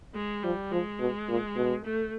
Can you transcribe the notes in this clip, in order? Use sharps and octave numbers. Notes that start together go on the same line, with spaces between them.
G#3
F3 G3
F3 G#3
B2
A#2
B2
A3